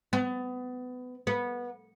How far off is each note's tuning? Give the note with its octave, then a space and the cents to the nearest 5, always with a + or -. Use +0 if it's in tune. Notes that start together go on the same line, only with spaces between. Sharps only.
B3 +25
B3 -20